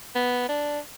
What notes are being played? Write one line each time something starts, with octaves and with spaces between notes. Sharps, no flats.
B3
D4